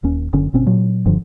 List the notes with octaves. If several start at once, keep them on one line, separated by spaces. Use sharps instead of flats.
D#1 D#2 C#4
F#1 D3 C#4
G1 B2 C4 C#4
A#2 F#3
F1 G2 D3 F3